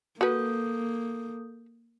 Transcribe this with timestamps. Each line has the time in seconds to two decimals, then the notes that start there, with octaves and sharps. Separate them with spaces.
0.21 A#3 F#4 A4 B4 D#6 G6